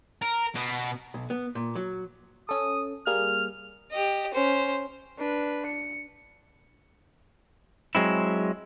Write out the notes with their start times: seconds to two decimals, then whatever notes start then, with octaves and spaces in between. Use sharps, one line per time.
0.22 A#4
0.55 B2
1.14 B1
1.30 B3
1.55 A#2
1.75 F#3
2.49 C#4 A4 D#6
3.07 G3 A#3 G#4 F6
3.92 G4 D#5
4.33 C#4 C5
5.18 D4 B4
5.66 C#7
7.95 F#3 G#3 C4 E4